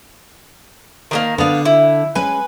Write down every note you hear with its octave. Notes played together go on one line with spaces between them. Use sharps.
D#3 F#3 A#3
D3 B3 D4 F5
E4
G#3 C#4 B4 G#5